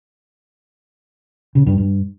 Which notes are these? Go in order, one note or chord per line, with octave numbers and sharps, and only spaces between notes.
C#3
G2
G2